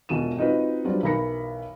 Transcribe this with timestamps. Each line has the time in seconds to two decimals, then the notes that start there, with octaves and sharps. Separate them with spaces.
0.09 E1 B2 E3 F4 D#7 E7
0.37 C4 D#4 F4 F#4 B4
0.85 F#3 G3 D4 F4 B4 C5
1.03 B1 E3 A#4 B5 A#6 C#7